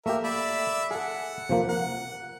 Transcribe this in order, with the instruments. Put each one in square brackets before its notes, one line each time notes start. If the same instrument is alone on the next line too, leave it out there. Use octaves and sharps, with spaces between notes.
[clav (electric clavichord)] A3 A#3 G4 [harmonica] A#4 E5
[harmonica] D5 E5 B5
[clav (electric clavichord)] G#4 A4 [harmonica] F#5
[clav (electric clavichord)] C3 F3 A#3
[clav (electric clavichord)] A#4 [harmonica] F#5